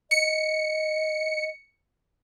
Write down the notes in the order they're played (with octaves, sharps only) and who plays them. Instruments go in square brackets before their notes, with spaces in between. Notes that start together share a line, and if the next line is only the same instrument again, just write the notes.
[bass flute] D#5 [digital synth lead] C#7